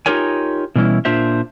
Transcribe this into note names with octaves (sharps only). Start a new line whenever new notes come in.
D#4 F4 G4 A#4 C#5 G#5
B2 E3 G3 C#4 E4
A#2 D4 F4 C5 E5